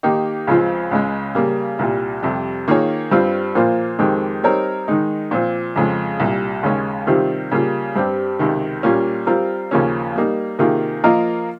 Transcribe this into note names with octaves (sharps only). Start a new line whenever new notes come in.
D#3 A#3 D#4 G4
C#2 C#3 F3 C4 F4
C#2 C#3 G#3
C#3 G3 A#3
C2 A#2 G3
F2 C3 G3
D#3 A#3 F4 G#4 C#5
G2 G3 C4 F4
A#2 F3 A#3 F4 C5
F2 D#3 G#3 C4 G4
G3 C4 D#4 A#4 C#5
D#3 G#3 D#4
A#2 F3 C4 F4
F2 C#3 F3 G#3
C2 A#2 G3
D#2 C#3 G#3 C#4
C3 D#3 G3 C4 F4
C#3 G3 A#3 F4
G2 G3 C4 G4
C#2 C3 D#3
A#2 G3 A#3 C#4 F4
G3 C4 F4 A#4
D#2 C#3 F3 A#3 C#4
G3 A#3 D#4
C3 D#3 A#3 F4 G#4
F3 A#3 F4 A#4 D#5